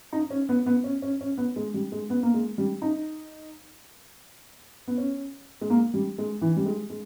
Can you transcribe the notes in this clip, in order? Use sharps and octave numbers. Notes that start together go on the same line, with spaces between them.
D#4
C#4
B3
B3
C#4
C#4
C#4
B3
G#3
G3
G#3
B3
A#3
G#3
G3
D#4
B3
C#4
G#3
A#3
G3
G#3
E3
G3
G#3
G#3